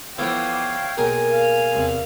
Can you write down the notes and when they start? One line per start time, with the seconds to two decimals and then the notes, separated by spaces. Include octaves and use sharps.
0.18 E3 F3 B3 A4 C#5 F5 G5
0.97 B1 A#3 G#4 A#4 G#5
1.32 F5
1.73 E2 C3